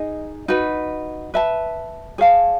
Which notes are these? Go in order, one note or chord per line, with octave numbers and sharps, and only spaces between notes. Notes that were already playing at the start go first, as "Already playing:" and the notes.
Already playing: D#4 G#4 D#5
D#4 F#4 B4
B4 E5 A5
G#4 C#5 F5 A5